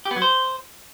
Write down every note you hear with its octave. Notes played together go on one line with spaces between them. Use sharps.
G4
B3
F#3
C5